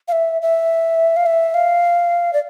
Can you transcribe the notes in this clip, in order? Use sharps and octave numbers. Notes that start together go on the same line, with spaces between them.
F5
E5
E5
F5
E5
F5
D5